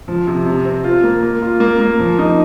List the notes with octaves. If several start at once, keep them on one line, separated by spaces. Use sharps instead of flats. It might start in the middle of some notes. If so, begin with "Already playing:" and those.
F3
C3
C3
C4
F4
A#3
A#3
F4
A#3
A#3
F3
D#4